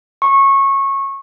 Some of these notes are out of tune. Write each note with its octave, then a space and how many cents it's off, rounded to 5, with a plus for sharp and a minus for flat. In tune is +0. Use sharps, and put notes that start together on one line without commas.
C#6 -20